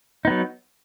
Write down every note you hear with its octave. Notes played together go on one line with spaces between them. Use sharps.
F#3 B3 D#4